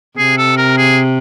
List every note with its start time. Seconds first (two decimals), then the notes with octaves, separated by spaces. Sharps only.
0.17 C3 G#4
0.38 A4
0.57 A#4
0.78 G#4